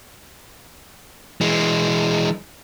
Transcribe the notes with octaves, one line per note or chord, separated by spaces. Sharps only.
E3 G#3